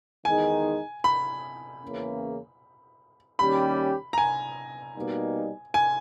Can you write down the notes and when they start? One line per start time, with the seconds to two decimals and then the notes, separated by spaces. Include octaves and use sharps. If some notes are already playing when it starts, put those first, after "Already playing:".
0.25 E2 D#3 G#3 D#4 G#4 G#5
1.04 B5
1.82 E2 C#3 E3 A#3 C#4
3.39 D#2 D#3 G3 C#4 G4 B5
4.13 A#5
4.18 G#5
4.96 B2 G3 A#3 D#4
5.74 G#5